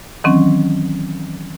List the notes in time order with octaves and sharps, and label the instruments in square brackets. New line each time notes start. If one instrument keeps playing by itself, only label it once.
[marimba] D#3 E3 F#3 C4 C#4